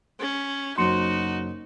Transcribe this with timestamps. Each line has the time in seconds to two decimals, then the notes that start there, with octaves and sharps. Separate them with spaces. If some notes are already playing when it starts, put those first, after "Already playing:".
0.19 C#4
0.78 F#1 F#3 D#4 F#4 C5 C6 C#7